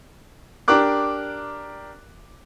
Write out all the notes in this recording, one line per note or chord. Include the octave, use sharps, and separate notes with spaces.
D4 G4 A#4 D6 F#6